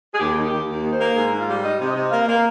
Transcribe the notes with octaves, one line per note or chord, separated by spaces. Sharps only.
G#4
D#2 G4
D#3
G4
D#2
D#2
D#3
C5
A#3
G#2 G#4
G#2
F4
G3
D#4 D#5
C3
D#5
C3
A#3 F5
A#3